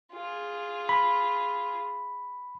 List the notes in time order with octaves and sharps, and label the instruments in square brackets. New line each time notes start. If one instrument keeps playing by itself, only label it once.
[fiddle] F4 G#4
[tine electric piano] B5